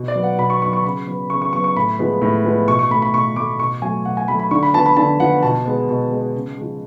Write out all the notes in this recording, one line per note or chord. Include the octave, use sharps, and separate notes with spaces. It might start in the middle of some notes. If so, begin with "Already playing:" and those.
Already playing: B2
D5
F#3 B3
F#5
B2 B5
C#6
F#3 B3 C#6
C#6
C#3 B5
F#3 B3
C#3 C#6
C#6
F#3 B3 C#6
C#6
A2 B5
F3 G#3 B3
A2
F3 G#3 B3
B2 C#6
C#6
A3 B5
B5
B2 C#6
A3 D6
B2 C#6
F#3 A3 G#5
B2 F#5
G#5
F#3 A3 B5
B5
D3 C#6
B5
F3 B3 A5
B5
D3 A5
F3 B3 F#5
B2 A5
G#3 B3
B2
G#3 B3
C#3
F3 G#3